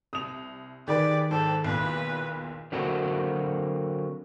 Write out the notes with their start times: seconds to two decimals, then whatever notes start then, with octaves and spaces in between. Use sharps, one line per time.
0.13 C2 D#6 F7
0.88 D#3 G4 G#4 B4 D5
1.31 G#2 A4 G5
1.65 B1 E2 A#2 B4
2.72 D3 F#3 A#3 C4 F#4